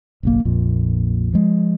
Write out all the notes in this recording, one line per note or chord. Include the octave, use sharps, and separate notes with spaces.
F#1 B1 A#3
A#1 F2 A#2
F3 G#3